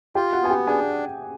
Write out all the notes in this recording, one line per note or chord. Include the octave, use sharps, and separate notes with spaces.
F4 G4 G5
F#4 F#5
B3 G#5
G4 G5
D4 G#4 G#5